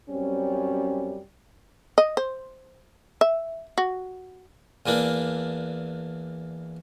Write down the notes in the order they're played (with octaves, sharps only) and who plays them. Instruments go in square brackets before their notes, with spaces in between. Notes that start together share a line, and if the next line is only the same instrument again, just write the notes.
[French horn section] F#2 G3 C4 C#4
[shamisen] D#5
C5
E5
F#4
[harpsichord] E2 E3 A#3 D4